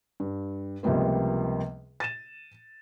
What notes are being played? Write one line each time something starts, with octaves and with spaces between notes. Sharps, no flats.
G2
C#2 C3 F3 G3 A#3 B3
A6 D#7 E7